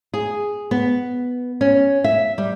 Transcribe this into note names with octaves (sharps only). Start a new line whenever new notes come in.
G#4
B3
C#4
E5
G3